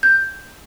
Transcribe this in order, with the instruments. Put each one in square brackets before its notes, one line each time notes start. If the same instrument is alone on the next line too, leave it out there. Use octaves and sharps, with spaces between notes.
[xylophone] G6